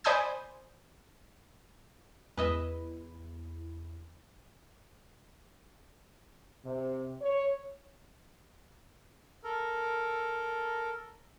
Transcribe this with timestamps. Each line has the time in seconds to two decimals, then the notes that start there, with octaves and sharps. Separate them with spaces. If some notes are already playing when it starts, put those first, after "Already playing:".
0.04 C5 D5 G#5 B5 D#6 G6
2.37 E2 E4 B4 D#5 E5
6.65 C3
7.22 C#5
9.44 A4 A#4